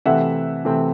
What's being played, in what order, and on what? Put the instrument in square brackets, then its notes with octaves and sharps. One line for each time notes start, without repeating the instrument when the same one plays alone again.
[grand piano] C3 E3 A3 C4 E5 F#5
C3 E3 A3 C4